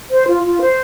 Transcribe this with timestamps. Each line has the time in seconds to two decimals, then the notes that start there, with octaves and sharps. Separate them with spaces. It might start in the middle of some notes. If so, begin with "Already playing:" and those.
0.11 C5
0.28 F4
0.44 F4
0.61 C5